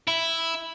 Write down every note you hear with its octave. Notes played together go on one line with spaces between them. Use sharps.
E4